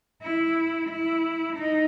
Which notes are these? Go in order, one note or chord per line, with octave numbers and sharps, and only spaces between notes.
E4
E4
D#4